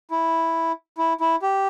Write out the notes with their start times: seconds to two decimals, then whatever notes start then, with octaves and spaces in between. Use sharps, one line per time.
0.11 E4
0.98 E4
1.21 E4
1.42 G4